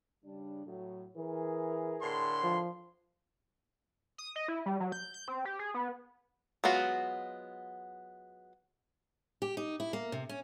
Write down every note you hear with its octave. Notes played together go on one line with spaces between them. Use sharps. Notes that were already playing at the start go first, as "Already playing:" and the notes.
C#3 G3 D4
A2 F#3
E3 G#4 A#4
A2 D3 C6
F3
D#6
D#5
E4
G3
F#3
G6
G6
C4
G4
G#4
B3
F#3 G#3 B3 F4 F#4
G4
D#4
E4
A#3
C3
C#4